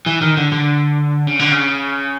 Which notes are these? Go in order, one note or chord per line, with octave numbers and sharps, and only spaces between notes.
E3
D#3
D3
D3
C#3
D3
C#3